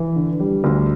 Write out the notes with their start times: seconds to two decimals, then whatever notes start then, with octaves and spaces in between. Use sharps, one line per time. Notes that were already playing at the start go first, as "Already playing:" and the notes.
Already playing: E3
0.16 D3
0.40 G3
0.64 D2